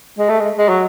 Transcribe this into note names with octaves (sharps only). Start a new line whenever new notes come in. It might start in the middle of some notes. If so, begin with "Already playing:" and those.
G#3
A3
G#3
G#3
F#3